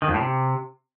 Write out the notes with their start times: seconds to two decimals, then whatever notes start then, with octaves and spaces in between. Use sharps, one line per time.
0.02 D#3
0.08 F2
0.14 A2
0.20 C3